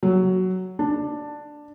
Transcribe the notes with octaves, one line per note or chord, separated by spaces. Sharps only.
F#3
D4